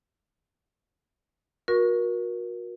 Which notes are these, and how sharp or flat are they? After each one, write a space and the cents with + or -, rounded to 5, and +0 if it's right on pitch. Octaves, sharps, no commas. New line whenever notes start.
F#4 -30 A#4 +30 C#6 +0